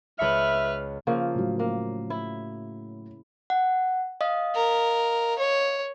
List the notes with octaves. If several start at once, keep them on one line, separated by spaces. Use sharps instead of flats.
C#2 B4 E5 B5 F6 C#7
C#3 F3 A#3
A2 F#3
A#3
E4
F#5
D#5 F5 D#6
A#4
C#5